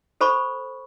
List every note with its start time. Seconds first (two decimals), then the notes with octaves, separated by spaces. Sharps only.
0.21 A4 C5 B5 C#6